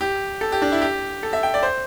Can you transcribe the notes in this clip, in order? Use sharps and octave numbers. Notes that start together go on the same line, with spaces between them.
G4
A4
G4
D4
E4
G4
A4
E5
G5
D5
C5